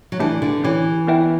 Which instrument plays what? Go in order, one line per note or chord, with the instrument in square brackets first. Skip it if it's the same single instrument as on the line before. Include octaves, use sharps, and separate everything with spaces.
[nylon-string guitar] F#3
[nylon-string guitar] E3 [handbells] A3 D4 G4
[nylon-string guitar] D3
[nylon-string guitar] E3 [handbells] C#4 G4 C#5
[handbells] B3 E4 B4 E5 G5